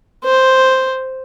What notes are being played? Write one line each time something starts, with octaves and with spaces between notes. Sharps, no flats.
C5